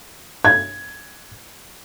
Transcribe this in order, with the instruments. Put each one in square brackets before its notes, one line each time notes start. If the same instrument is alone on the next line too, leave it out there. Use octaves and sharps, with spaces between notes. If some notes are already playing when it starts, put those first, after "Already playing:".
[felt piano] G#6